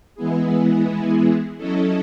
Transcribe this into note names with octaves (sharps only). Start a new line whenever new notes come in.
E3 G#3 B3 E4 G#4
F#3 C#4 E4 A4 D#5